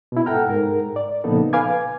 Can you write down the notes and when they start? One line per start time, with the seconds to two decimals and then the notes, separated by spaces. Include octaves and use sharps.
0.12 B2 E4
0.26 G#2 A4 F#5 G5 A#5 F6
0.49 G#2 A#4
0.96 D5
1.24 A#2 C#3 F3 B3 D#4 A4
1.53 B4 F5 G#5 D6 G#6